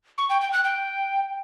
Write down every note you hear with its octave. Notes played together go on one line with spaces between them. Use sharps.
C#6
G5
G5
F#6
G5